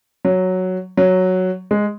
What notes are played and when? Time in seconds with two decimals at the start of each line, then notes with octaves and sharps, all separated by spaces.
0.25 F#3
0.97 F#3
1.71 G#3